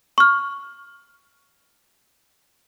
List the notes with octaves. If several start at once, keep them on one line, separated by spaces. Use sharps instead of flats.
C#6 F6